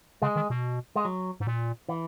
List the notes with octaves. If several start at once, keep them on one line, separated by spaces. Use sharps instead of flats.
C#3 G#3
D#3
B2
G#3
F#3
G#2
A#2
E3